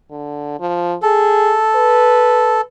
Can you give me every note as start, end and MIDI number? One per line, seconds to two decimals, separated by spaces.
0.11 0.56 50
0.60 0.95 53
1.02 1.57 68
1.02 2.61 69
1.76 2.64 71